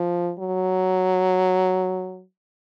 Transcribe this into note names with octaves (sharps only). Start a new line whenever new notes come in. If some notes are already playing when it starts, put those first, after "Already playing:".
Already playing: F3
F#3